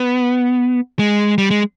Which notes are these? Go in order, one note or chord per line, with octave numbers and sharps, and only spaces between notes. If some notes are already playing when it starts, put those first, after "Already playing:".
Already playing: B3
G#3
G3
G#3